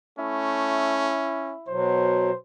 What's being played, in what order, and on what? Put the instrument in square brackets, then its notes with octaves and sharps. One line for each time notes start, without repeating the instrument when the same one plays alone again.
[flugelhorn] A3 [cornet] C#4 [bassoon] E4
[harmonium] B2 F#3 [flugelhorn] C5